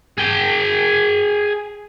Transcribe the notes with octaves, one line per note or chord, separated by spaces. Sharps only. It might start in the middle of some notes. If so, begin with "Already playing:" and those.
G#4 G5